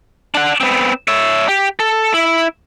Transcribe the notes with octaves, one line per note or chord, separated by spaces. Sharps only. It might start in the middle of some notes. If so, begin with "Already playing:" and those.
D4 F#5
B3 C4
C#5 E5
G4
A4
E4